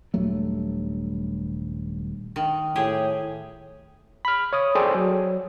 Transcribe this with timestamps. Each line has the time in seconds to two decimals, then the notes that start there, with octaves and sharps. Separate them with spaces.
0.14 D#1 G2 F#3 A3
2.36 D#3
2.76 A2 G4 G#4
4.25 B5 F6
4.53 C#5 D#6
4.75 G#4 A4 C5 D5 G5 G#5
4.95 F#3